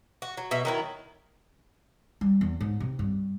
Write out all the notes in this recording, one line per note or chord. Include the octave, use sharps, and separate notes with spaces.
F#4
F#3
B2 E5
D#3 F#3 E4
G3
E2
G#2
C3
G2